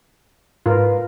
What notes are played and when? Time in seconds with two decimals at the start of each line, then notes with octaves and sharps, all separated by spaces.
0.66 G#2 F4 A#4 B4